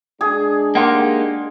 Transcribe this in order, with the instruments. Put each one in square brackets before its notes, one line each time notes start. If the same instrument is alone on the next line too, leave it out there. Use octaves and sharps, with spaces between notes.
[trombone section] G#3 D4 [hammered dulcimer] G#4
[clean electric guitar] A#3 D#4 G4 [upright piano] F5 F#5 C6